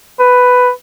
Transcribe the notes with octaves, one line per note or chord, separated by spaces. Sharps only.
B4